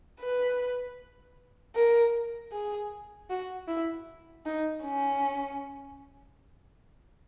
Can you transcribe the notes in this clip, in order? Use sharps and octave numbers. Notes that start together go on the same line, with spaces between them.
B4
A#4
G#4
F#4
E4
D#4
C#4